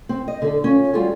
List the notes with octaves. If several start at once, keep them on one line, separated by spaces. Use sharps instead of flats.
C4
D#5
D3 A4
C#4 F4
G3 F4 F#4 G#4 A4